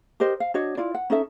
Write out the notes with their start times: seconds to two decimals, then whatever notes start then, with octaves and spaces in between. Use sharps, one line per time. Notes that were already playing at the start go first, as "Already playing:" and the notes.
0.20 G4 A#4 C5 D#5
0.40 F5
0.54 D4 F#4 C#5 D#5
0.77 E4 F4 D5
0.94 F#5
1.10 C#4 D#4 A4 E5